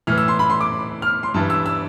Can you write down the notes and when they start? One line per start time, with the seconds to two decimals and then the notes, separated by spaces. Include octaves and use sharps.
0.07 A2 E3 F6
0.18 E6
0.28 C6
0.39 B5
0.50 C6
0.61 D6
1.02 F6
1.23 C6
1.34 G2 E3 A5
1.50 E6
1.66 E6